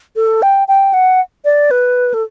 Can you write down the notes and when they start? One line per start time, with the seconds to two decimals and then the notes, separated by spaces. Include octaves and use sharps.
0.16 A4
0.42 G5
0.68 G5
0.93 F#5
1.45 D5
1.71 B4
2.14 A4